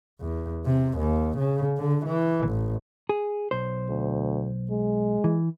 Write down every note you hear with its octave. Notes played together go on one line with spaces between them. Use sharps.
E2
C3
D#2
C#3
D3
E3
A1
G#4
B1 C5
D2
G#3
E3